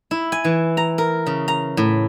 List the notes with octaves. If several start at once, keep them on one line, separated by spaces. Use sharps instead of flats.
E4
G#5
E3
A#5
A#4
C#3
A#5
A2